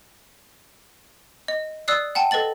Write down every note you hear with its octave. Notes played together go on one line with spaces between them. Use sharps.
D#5
D5 D#6 E6 F#6 C7
F#5 G5 A5
A4 B4 D#5 A6 F#7